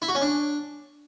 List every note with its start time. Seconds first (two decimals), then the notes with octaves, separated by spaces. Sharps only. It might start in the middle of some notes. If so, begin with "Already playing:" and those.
0.02 E4
0.08 F#4
0.15 C#4
0.22 D4